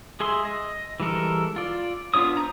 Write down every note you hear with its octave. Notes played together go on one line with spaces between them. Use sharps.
G#3 G#4 E5 C6
D#5
E3 G3 G#3 A4 A#4
F4 D5
B3 D4 F4 C#5 D#6
C5 A#5